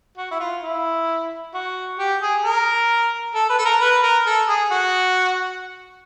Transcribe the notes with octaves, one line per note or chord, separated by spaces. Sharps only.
F#4
E4
F4
E4
F#4
G4
G#4
A#4
A4
B4
A4
A#4
B4
A#4
A4
G#4
F#4